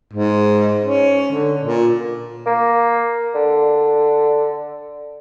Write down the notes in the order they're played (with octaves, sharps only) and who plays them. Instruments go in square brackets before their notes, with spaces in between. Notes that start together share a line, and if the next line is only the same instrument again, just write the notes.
[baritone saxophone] G#2
C#4
D3
A#2
[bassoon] A#3
D3